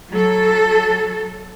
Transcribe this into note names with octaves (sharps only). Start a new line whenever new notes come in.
F#3 A4